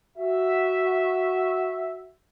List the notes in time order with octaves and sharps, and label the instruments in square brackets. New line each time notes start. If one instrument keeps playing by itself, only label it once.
[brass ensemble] F#4 E5